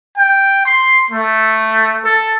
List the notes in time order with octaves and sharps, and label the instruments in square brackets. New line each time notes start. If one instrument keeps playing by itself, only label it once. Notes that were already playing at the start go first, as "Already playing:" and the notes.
[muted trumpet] G5
C6
A3
A4